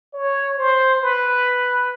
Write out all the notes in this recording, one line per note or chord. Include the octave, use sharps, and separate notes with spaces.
C#5
C5
B4